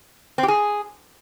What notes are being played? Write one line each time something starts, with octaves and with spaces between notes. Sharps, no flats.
C4
G4
G#4